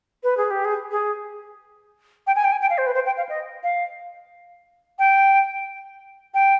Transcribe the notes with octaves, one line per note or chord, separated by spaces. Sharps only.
B4
G#4
G4
G#4
G#4
G5
G#5
G5
G#5
G5
F5
C5
B4
C5
G5
F5
D#5
F5
G5
G5